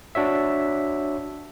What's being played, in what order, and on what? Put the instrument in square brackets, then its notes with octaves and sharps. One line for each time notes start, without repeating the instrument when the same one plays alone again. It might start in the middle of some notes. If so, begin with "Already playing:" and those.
[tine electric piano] D4 F#4 C#5 E5